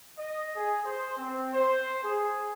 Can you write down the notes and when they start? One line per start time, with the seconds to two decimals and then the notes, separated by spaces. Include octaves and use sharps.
0.18 D#5
0.56 G#4
0.86 C5
1.17 C4
1.54 C5
2.03 G#4